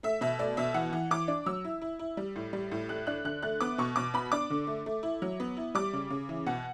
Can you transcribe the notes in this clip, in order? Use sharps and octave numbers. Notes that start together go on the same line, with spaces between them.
A3 E5
B2 E5
A3 D5
B2 E5
E3 F#5
E3
E3 D6
D4
F#3 E6
E4
E4
E4
G3
A2
G3
A2
A3 F#6
D4 F#6
D3 F#6
A3 F#6
B3 D6
B2 C#6
B2 D6
B3 B5
D4 D6
D3
A3
A3
E4
F#3
B3
E4
G3 D6
C#3
C#3
E3
B2 F#5